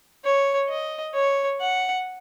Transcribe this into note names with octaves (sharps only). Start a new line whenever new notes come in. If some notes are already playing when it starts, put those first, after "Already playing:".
C#5
D#5
C#5
F#5